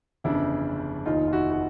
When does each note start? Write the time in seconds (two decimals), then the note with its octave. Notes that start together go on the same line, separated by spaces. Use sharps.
0.24 G1 F2 C#3 E3 D4 E4
1.05 F1 D#2 D#3 D#4 F4
1.28 F4
1.33 E4 F#4
1.51 F#4